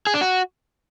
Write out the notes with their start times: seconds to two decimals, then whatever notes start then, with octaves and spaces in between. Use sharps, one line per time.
0.07 G#4
0.14 D4
0.21 F#4